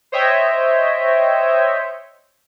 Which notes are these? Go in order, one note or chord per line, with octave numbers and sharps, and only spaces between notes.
C5 C#5 D#5 E5 G5